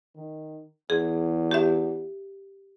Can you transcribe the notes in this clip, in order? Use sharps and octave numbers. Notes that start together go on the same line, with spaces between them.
D#3
E2 G#4
G4 E5